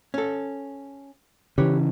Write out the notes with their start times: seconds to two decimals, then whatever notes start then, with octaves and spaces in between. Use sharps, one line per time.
0.14 C#4 A4
1.58 C#3 E3 G4 B4 C#5